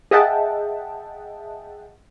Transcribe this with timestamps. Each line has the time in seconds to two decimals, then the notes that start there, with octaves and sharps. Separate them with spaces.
0.11 G#4 D#5 E5 F#5 G5 A5